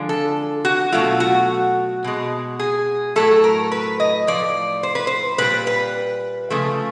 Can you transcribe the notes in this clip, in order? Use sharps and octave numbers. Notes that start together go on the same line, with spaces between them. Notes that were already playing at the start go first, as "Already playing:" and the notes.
Already playing: D3 F3 G#3
A4
F#4
B2 F#3 A3 F4
F#4
B2 G#3
G#4
A2 F#3 A3 A4
A#4
B4
D#5
A2 F3 D5
C5
B4
C5
A#2 G3 B4
B4
C#3 F3 A3